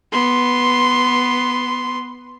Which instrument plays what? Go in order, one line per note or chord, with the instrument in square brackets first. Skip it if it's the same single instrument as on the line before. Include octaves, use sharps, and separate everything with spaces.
[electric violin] B3 C6